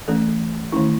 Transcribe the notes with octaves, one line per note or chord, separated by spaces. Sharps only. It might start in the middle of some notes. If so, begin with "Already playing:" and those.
E3 A3 C#4 A4
D#3 A3 C#4 E4